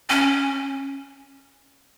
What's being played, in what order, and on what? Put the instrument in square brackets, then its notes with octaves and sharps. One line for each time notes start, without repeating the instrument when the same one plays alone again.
[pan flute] C#4